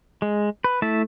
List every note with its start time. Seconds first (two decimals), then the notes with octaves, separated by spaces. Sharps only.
0.22 G#3
0.64 B4
0.82 A3 E4 E5 A5